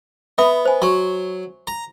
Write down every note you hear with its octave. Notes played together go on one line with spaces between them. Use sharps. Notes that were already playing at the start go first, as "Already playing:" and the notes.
B3 E5 B5 D#6
C5 G#5
F#3 C6 C#6
A#5